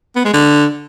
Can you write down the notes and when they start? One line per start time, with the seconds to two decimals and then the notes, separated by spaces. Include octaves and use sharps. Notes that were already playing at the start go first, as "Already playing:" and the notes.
0.16 B3
0.25 G#3
0.33 D3